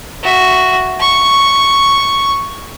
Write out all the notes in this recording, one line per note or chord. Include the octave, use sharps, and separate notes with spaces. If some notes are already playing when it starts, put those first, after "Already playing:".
F#4 E5
C#6